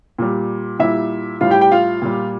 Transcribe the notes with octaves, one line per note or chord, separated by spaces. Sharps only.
A#2 G3
A#2 G3 E4 E5
A2 G3 F4 F5
G4 G5
G4 G5
F4 F5
A#2 G3